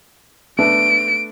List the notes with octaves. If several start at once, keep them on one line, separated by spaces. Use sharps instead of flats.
A3 B3 D4 D7